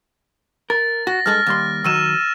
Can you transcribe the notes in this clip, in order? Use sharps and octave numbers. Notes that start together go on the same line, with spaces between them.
A#4 A6
F#4 A#6
G2 G#3 A4 F6
D#2 G3 C6
D#3 F#3 E6 D#7 E7